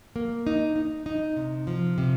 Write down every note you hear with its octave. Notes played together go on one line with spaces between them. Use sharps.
A#3
D#4
D#4
D#4
C3
F3
C3